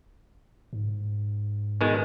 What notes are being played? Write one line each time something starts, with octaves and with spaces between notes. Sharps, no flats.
G#2
B2 D#3 G#3